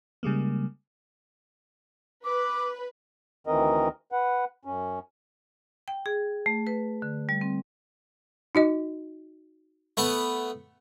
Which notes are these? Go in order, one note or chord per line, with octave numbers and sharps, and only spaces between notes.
C#3 G3 G#3 A#3
B4 D6
D2 D#3 E3 C4 A#4 D#5
B4 F#5
F#2 C#4
G5
G#4
A3
B4
D3
G3
C4
D#4 F#4 D#5
A3 B3